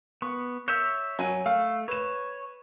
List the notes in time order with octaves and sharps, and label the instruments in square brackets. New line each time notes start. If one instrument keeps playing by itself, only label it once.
[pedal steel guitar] B3 [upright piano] C#6
[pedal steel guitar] C#5 E5 [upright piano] G6 E7
[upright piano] F#3 G#5 D#7
[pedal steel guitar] A3 [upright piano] F5
[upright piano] B4 E7 [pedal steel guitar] C#5